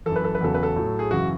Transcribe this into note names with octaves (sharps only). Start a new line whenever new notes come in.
F#2 E3 A4
B4
A4
B4
E2 C#3 F#3 A4
B4
A4
A2 F#3
G#4
F#2 C#3 E3 F#4